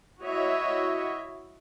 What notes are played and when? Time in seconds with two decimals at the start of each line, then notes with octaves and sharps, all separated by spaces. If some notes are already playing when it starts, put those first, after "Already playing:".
0.21 E4 F#4 C#5 D#5 E5